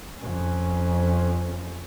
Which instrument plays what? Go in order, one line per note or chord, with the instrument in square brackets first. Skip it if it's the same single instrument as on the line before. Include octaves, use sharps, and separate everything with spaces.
[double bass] F2 C#4